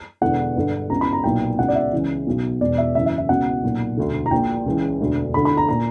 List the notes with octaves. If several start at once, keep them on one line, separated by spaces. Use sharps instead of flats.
E1 E2 D3 F#5
G1 G2 D3
C#2 B2 A#5
B5
A#5
B1 A#2 G5
C#2 B2 F#5
D5
E5
C#2 C#3 E3
B1 B2
E1 E2 B2 D5
E5
F#1 F#2 E3 E5
E5
E5
C#2 B2 F#5
B1 A#2
E1 D2 D3
A#5
A#1 A#2 G5
C#2 C#3 E3
E1 D2 D3
D2 D3 B5
B5
A#5
A#2 A#5